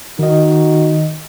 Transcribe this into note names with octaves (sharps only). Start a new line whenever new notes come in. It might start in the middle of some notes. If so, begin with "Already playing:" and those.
D#3 D#4 F#4 D#5